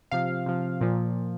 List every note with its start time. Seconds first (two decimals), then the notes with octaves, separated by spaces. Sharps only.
0.11 C3 F3 F5
0.46 C3 F3
0.81 A#2 F3